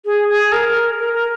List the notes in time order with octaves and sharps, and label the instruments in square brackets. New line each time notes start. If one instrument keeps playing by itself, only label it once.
[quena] G#4
G#4
A#4
A#4
A#4